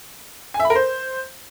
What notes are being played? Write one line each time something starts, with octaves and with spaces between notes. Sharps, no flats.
G#5
E5
B5
A#4
C5